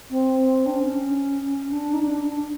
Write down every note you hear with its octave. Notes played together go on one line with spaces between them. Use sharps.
C4
D4
C#4
D4
D#4
D4